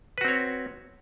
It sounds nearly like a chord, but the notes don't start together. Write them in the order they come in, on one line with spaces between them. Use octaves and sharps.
B4 F#4 C4 C#5